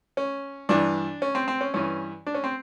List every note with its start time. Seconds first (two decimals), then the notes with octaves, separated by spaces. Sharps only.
0.17 C#4
0.69 G2 E3 D4
1.22 C#4
1.35 C4
1.48 C4
1.61 C#4
1.74 G2 E3 C#4
2.27 D4
2.34 C#4
2.44 C4